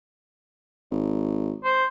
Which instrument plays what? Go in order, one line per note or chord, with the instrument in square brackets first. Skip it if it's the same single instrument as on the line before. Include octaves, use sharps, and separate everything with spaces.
[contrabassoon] G#1
[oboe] C5